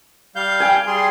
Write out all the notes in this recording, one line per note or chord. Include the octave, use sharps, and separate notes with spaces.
G3 F5 G6
G5 G#5
G3 G#4 C6